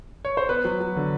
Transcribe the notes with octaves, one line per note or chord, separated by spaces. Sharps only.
C#5
C5
B3 B4
F#3
F#3
D3